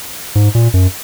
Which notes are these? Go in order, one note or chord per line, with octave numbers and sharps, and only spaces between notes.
G#2
A#2
F#2